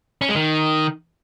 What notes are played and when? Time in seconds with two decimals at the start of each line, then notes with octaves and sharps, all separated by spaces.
0.22 C#4
0.29 G#3
0.36 D#3